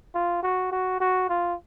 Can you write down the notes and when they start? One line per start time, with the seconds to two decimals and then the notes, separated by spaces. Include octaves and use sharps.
0.14 F4
0.43 F#4
0.72 F#4
1.00 F#4
1.29 F4